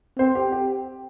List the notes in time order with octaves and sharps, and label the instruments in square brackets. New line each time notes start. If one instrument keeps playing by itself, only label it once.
[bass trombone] C4 [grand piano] C5
[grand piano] G4
G4